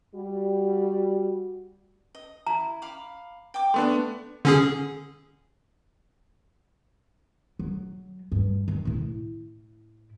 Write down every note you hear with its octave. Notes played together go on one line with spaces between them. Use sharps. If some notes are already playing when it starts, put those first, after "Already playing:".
G3 F#4
D#5
E4 A#5
F5 B5 D6
G5 D6
A3 B3 D4 C6 C#6
D3 C#4 G#4
F#3
G2
D#3
A2 E4